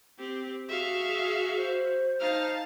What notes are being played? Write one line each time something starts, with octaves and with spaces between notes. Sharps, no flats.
C4 G4
F#4 G#4 E5 F5
C5
D#4 F5 A5 F6